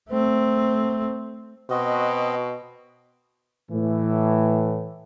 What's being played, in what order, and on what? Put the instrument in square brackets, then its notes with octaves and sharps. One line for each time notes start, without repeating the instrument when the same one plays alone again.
[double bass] A3 C4
[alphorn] B2 [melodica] C4 F#4 D#5
[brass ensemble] A2 E3